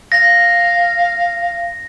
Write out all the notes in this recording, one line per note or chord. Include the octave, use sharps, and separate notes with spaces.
F5 A#6